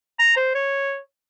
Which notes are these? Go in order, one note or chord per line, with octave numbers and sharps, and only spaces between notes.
A#5
C5
C#5